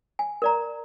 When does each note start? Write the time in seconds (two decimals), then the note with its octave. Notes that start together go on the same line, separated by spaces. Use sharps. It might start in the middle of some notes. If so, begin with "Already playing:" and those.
0.19 G#5
0.42 A#4 D5 A#5